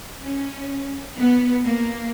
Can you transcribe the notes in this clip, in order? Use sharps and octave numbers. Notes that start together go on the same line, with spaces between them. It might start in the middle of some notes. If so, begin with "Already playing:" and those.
C#4
B3
A#3